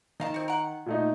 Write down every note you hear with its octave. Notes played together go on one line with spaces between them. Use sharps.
D#3 D#5 F5 A5
C4 F#4
A#4 F#5
A#2 A3 D#4